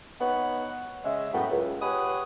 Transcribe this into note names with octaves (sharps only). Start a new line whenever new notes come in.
B3 D#4 B4 C#5 F#5
C#3 G#3 D#5 E5
F#2 A2 F#3 B3 F#5 G5
C#2
G4 G#4 B4 C#5 F#5 D#6